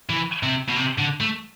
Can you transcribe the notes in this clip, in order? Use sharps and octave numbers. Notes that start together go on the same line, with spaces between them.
E3
C3
B2
C3
D3
A3